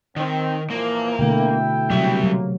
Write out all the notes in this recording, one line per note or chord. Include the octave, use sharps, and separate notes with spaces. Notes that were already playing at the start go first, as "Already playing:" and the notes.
D#3 C4
A#2 E3 F3 A#3
B2 D3 A3 E4 G5
C3 F#3 G3 E5
F#3 A#3